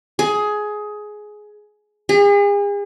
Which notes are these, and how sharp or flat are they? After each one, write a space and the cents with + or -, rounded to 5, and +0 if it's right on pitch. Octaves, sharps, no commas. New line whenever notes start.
G#4 +15
G#4 -40